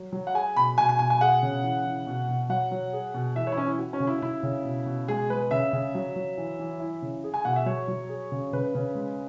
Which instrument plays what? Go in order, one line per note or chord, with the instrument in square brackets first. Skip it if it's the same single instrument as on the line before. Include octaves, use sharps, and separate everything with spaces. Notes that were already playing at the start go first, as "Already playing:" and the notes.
Already playing: [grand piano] F#3
F#3
[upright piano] F#5
[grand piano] G#4 [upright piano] G#5
[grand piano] B2 [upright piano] B5
[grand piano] B2 [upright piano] G#5
[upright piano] G#5
[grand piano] B2 [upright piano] G#5
[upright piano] G#5
[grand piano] G#4 [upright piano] F#5
[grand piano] C#3
E3
E3
B2
B2
[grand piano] F#3 [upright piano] F#5
[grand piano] F#3
G#4
B2
[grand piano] E3 [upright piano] E5
[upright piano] C#5
E4
[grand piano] E3 [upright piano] C#4
[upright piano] E4
[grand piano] F#4
[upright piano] C#4
[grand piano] C#3
[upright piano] E4
[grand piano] C#3 [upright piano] E4
[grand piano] C#3
B2
B2
[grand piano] G#3 [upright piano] G#4
[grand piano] G#3 [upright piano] B4
[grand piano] C#3 [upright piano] E5
[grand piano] C#3
F#3
F#3
E3
E3
E4
C#3
G#4
[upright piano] G#5
[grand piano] B2 [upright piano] F#5
[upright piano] E5
[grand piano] F#3 [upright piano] C#5
[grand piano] F#3
G#4
C#3
[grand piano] C#3 [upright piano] B4
[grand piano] C#3
G#3